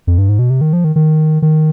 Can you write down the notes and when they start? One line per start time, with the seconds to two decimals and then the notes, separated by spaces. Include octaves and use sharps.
0.07 F2
0.18 G2
0.29 G#2
0.39 B2
0.50 C3
0.61 D#3
0.73 F3
0.84 D#3
0.96 D#3
1.42 D#3